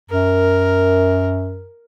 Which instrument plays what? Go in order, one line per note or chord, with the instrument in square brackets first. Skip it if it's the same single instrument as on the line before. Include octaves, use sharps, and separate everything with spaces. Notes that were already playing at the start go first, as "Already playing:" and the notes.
[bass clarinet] F#2 [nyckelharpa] A#4